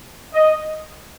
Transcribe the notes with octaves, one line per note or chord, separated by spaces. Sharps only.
D#5